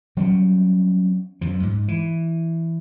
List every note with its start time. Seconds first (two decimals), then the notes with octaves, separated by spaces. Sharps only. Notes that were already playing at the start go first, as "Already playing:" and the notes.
0.17 F#3 G3 C4 C#4
1.41 F#2 F3
1.63 G#2
1.88 E3